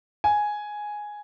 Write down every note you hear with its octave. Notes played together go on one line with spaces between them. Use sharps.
G#5